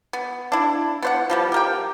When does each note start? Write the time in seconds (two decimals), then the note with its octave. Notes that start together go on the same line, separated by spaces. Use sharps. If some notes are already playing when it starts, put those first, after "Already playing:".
0.13 B3
0.52 D4 E4
1.02 B3 C5 F#5
1.30 F3 G3 B3
1.52 G4 A#4 G5